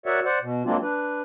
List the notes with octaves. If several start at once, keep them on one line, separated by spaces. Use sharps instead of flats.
F#4 A#4 C#5 D5 E5 F#5
C5 D5 F#5
B2
F#3 G#3 A#3 C4 D4 F4
D4 B4